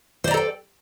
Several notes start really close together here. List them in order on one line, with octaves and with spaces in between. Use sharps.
C5 D5 A#5 A4 G5